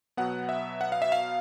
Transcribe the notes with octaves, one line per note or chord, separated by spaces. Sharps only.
B2 F#3 B3 F#5
E5
F#5
F5
E5
F5